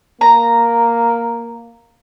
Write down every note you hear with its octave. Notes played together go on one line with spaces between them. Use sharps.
A#3 A#5